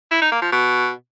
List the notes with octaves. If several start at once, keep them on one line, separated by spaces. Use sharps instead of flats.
E4
D#4
A#3
F3
B2